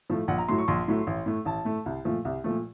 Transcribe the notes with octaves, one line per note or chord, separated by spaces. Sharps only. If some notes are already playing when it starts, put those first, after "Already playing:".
A2 F3 A3
A#1 F#5
A#5
A2 F#3 A3 C6
C#6
A#1 C6
A2 F#3 A3
A1
A2 A3
A1 A5
A2 A3
C2
A#2 F3 A3
C2
A#2 F3 A3